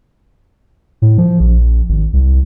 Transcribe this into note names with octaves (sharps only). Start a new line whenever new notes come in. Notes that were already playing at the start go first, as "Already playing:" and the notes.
A2
F3
A#1
G#1
C2